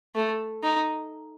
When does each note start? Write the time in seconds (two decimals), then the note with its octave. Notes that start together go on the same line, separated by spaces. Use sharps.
0.15 A3
0.64 D#4